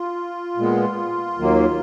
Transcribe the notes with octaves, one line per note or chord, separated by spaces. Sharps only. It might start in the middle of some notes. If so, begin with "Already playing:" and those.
Already playing: F4
A#2 G#3 B3
D#2 D#3 F#3 A#3